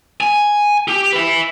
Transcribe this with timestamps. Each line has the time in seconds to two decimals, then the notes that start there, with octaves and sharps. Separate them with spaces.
0.21 G#5
0.88 G4
1.13 B4 E5